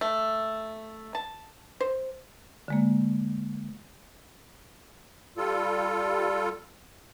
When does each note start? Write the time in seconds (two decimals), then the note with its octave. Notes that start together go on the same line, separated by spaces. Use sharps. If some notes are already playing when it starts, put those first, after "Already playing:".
0.01 A3
1.15 A5
1.80 C5
2.68 D3 G#3 A#3
5.37 G3 F4 A4